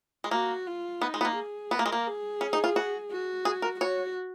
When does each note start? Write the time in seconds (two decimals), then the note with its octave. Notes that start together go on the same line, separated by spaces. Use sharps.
0.24 G#3
0.31 A#3 F#4
0.67 F4
1.01 B3 D#4
1.14 G#3
1.21 B3
1.25 A#3
1.36 G#4
1.71 B3 A#4
1.79 A#3
1.86 G#3
1.92 A#3
2.07 G#4
2.41 C#4
2.53 D#4
2.64 F4
2.76 F#4
3.11 F#4
3.45 G#4
3.62 A#4
3.80 F#4 C#5